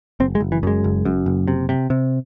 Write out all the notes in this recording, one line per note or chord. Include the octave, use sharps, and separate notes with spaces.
F#1 C4
G#3
F#1
E3
F#2 G#3
F#1
F#2
F#1
C3
C3
C3